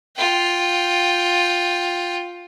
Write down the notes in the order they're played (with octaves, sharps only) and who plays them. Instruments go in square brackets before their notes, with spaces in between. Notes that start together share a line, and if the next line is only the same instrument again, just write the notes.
[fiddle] F4 G5